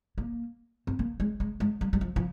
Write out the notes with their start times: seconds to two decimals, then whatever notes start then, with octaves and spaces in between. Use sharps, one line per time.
0.18 A#3
0.87 C4
0.99 A#3
1.20 G#3
1.40 G#3
1.60 G#3
1.81 G3
1.93 G3
2.01 F3
2.16 F3